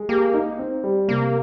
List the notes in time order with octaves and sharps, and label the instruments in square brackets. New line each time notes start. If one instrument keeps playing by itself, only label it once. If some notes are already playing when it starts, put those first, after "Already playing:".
Already playing: [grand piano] G#3
[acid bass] A#3 [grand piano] G4
[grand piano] D#4
C4
G3
[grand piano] C3 [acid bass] A#3